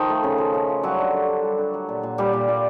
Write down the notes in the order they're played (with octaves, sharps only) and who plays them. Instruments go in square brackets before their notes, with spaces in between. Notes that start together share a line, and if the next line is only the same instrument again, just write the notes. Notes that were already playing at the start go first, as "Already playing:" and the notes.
Already playing: [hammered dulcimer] D#3 F3 D#4
A3
C#3
F3
C#3
F3
F#3 G3 F#4
D3
D3
D3
G3
D3
F#3
A#2
A#2
A#2 G3 G4
A#2
A#2